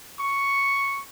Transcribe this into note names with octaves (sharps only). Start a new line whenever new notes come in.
C#6